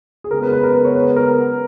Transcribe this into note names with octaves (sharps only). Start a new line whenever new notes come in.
G#4
C#3 G#3 B3 A#4
B4
B4
A#4
B4
C#5
B4
A#4